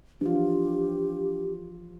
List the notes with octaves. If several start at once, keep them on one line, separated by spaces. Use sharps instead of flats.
E3 F3 D4 F4 G4